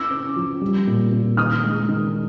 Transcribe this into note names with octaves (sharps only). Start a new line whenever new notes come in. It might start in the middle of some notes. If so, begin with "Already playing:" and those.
Already playing: C#4 D6 E6
C#4
F3
G3
A#2
A#2
D#3 D#6 F6
G#3
D#3